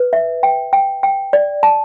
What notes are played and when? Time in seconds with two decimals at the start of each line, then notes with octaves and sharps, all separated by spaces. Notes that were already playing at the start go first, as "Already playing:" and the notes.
Already playing: B4
0.13 E5
0.43 G5
0.73 G5
1.03 G5
1.33 D5
1.63 A5